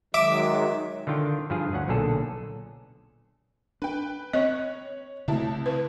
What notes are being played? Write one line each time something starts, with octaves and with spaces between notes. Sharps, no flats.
D#3 F#3 G#3 E5 D6
D3 D#3 F4 G5
G2 F3 F4 G#4
D2 C#4 F#5
B1 A#2 D3 G#4 A4
D4 B4 G5
C4 C#5 D#5 F#6
C2 C#3 A3 E4 A5
B4